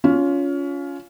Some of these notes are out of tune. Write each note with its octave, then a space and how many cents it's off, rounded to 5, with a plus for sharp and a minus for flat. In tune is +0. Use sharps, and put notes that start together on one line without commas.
C#4 +25 F4 +5